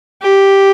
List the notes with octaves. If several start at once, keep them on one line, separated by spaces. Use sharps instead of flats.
G4